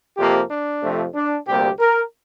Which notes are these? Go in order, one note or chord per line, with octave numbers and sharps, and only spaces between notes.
F2 C3 F3 A#3 G4
D4
F2 C3 F3 A3
D4
D2 C3 G3 A#3 G4
A#4